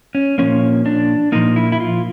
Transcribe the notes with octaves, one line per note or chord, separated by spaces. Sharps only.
C#4
A#2 F3 A#3 C#4
D4
A#2 F3 A#3 D#4
E4
E4
F4